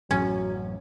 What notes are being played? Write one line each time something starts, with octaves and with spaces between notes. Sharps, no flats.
A1 F#2 F#3 C#4